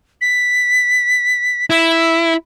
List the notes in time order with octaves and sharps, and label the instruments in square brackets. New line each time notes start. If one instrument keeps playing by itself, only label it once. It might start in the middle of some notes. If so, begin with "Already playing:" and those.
[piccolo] B6
[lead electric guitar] E4 [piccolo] E6